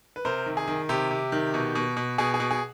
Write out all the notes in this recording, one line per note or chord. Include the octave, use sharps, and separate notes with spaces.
B4
C3 A#4 C5
D#3
G#4
D#3
C3 G4
C3
D#3
B2
B2
B2
B2 G#4
G#4
B2
G#4